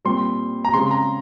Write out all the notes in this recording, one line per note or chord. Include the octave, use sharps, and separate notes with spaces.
A#2 G3 C4 C6
A#5
C#3 G#3 C4 C6
A#5